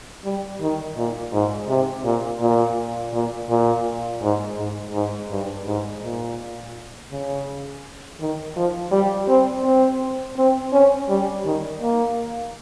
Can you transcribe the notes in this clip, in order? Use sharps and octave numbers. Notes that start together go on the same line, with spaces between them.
G3
D#3
A#2
G#2
C3
A#2
A#2
A#2
A#2
G#2
G#2
G#2
G2
G#2
A#2
C#3
D#3
F3
G3
C4
C4
C4
C#4
G3
D#3
A#3